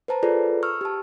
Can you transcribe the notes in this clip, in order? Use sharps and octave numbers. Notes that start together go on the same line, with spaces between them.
B4 C5 A5 A#5
F4 G#4 A4 B4 D5
C#6 E6 F6
G4 A5